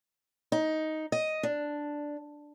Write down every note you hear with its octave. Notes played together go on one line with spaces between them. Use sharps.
D#4
D#5
D4